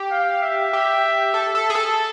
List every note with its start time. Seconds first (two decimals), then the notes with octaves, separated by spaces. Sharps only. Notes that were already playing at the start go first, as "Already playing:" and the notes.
Already playing: G4
0.11 F5
0.42 E5
0.73 G4
1.34 A4
1.55 A4
1.70 G#4
1.75 A4